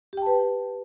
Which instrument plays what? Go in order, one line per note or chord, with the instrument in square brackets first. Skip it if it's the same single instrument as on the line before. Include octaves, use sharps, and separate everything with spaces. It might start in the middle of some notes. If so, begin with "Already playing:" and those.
[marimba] G4
G5
A5
B4